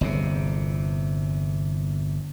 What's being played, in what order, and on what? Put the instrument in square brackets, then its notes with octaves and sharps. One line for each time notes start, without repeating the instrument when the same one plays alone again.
[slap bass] G1 E2 C3